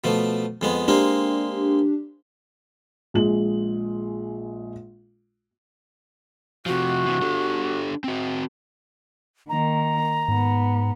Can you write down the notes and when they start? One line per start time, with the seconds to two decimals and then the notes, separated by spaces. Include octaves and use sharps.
0.04 B2 F3 A3
0.61 F2 G#3 B3
0.88 G#3 A#3 C4 D4 G4
3.14 A#1 G#3 F#7
6.66 C3 F3 F#4
7.06 C3 E3
7.22 D4 G4 A4
8.04 C4 F#4
9.49 D#3 A#3 A#5
10.28 G#2 B3